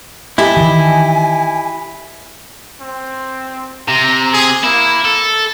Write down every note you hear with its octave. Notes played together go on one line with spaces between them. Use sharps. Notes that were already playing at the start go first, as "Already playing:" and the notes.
E4 G4 D#5 G#5 A5
D#3 E3
C4
C3 A#5
G#4
A#3 E4
A4